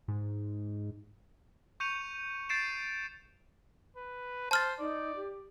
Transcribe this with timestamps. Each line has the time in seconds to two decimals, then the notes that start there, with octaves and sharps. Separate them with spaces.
0.08 G#2
1.80 C#6 G6 C#7 D#7 F7
2.49 G6 A6 C7 D7 E7
3.97 B4
4.51 C5 A5 F6 A6
4.79 D#4 D5
5.16 G4